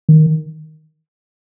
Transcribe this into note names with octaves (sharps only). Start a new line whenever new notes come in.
D#3